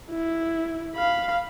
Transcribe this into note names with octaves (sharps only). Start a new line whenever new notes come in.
E4
F5 B5